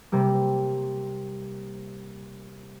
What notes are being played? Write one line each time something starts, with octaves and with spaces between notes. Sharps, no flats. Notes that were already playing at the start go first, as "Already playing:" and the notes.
C3 G3 A#3